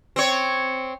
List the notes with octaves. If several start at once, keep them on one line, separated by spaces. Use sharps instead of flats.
C4 C#5